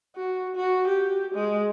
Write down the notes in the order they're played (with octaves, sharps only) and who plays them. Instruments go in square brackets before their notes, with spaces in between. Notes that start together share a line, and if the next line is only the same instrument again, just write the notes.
[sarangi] F#4
F#4
G4
G#3